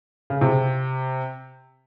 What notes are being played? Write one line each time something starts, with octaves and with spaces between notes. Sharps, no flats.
C#3
C3